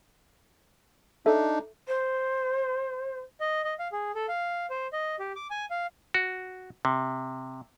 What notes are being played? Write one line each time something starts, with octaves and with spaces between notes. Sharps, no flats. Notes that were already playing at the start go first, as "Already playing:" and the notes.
D4 D#4 A4 E5
C5
D#5
D#5
F5
G#4
A4
F5
C5
D#5
G4
D6
G#5
F5
F#4
C3